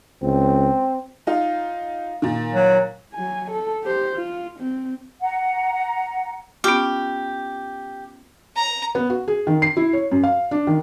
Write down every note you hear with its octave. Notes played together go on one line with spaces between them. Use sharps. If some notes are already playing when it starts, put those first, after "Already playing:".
C#2 C4
D#4 F4
A#2 D#3
F#3
F#3 G#5
A4
G4 C5
F4
C4
F#5 A#5
B3 C#4 F4 G4
A#5
B3
F#4
G#4
D#3
C7
E4
C#5
F#2
F5
D4
D#3